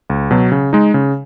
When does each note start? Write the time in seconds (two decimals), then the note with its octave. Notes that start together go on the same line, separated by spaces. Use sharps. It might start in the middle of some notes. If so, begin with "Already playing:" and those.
0.10 C#2
0.31 B2 F#3
0.52 C#3
0.73 G#3 D#4
0.94 C#3